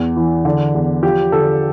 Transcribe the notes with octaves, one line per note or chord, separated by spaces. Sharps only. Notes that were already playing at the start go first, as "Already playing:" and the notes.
Already playing: E2
E3
D3
E2
F3 G4
D3 A4